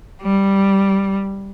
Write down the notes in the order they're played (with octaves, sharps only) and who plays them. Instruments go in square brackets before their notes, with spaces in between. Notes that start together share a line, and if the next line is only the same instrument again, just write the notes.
[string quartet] G3